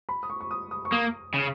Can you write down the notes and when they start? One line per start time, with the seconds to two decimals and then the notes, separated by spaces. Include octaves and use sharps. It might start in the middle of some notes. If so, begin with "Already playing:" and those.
0.09 B5
0.23 D#6
0.30 C#6
0.41 C#6
0.51 D#6
0.71 D#6
0.85 C#6
0.92 A#3 D#6
1.34 C#3